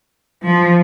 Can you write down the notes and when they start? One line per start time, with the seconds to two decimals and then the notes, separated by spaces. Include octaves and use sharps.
0.45 F3